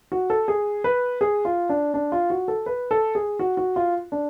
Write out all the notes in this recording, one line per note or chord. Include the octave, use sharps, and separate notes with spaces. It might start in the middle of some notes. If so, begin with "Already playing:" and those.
F#4
A4
G#4
B4
G#4
F4
D4
D4
F4
F#4
A4
B4
A4
G#4
F#4
F#4
F4
D4